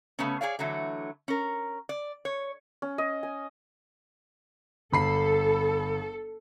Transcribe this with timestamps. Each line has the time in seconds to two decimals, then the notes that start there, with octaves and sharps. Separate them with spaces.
0.19 C#3 A3 B3 C#4
0.41 G#4 C#5 D5 F5
0.59 D3 E3 F#3 A3
1.28 C#4 A#4
1.89 D5
2.25 C#5
2.82 C#4
2.98 D#5
3.23 G#5
4.92 G1 A4 B5 C7